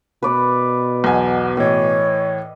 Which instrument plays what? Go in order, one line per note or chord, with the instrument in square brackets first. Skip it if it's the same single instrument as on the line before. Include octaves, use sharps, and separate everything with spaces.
[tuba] B2 [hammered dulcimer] B4 D5
[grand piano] B1 E2 G#5 [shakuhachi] F#5
[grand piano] A2 E3 [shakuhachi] C#5 [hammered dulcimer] D#5